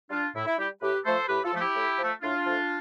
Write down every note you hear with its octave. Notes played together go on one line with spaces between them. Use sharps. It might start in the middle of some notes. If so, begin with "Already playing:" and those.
G3 D4 F4
A2 E4
E4
G3 E4 G4
A2 G4 B4
F3 A3 A4 C5
A2 G4 B4
F4 A4
F3 A3
E4 G4
A2
F3 A3
A2 D4 F4
F3 A3